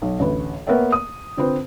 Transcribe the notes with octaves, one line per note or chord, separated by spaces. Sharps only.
B1
A1 D2 B4
A#3 B3 A#4 C#5 E5 G5
D#6
D3 C4 F4 B4 C5